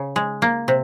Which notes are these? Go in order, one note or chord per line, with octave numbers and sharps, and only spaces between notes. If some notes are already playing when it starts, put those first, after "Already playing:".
Already playing: C#3
G#3
A#3
C3